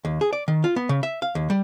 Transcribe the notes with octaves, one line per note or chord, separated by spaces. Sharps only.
D#2
G#4
D5
D#3
F4
B3
C#3
E5
F5
D#2
G3